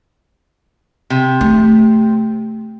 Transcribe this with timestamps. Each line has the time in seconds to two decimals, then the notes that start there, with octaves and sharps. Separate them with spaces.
1.10 C3
1.41 A3